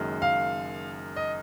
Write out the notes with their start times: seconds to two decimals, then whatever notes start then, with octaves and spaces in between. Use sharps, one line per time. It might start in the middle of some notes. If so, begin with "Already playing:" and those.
Already playing: F#1 F#2 D#3 G#3
0.22 F5
1.17 D#5